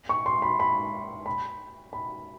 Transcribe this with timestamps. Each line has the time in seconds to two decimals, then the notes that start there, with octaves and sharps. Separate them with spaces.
0.09 C#6
0.26 C6
0.42 B5
0.60 B5
1.26 B5
1.93 B5